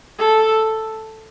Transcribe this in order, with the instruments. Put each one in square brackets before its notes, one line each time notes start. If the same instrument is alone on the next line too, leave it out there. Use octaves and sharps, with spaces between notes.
[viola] A4